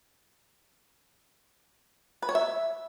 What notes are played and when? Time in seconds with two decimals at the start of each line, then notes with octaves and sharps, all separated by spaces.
2.22 B4
2.29 C#5
2.35 E5